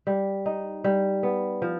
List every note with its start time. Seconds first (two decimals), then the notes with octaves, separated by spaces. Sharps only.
0.07 G3
0.46 D#4
0.84 G3
1.23 B3
1.62 F3